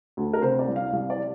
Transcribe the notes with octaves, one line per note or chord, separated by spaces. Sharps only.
D2
A#4
C3 C5
D5
C2
F5
C2 F5
D5
G3